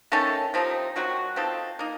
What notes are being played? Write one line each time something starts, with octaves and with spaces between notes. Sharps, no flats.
D#3 A3 C#4 A4
C3 F3 C4 D#4
D#3 F#3 C4 F#4
F3 C4 D#4 A4
A#3 D#4